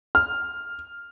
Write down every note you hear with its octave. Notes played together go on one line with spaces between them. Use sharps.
F6